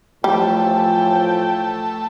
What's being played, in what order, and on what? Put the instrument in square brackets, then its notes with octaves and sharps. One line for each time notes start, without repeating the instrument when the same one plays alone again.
[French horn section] A2 E3 F3 [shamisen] G3 [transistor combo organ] A3 [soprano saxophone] G5